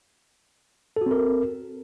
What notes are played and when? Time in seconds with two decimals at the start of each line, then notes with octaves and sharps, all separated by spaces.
0.96 A4
1.01 F#4
1.06 C4
1.11 A#4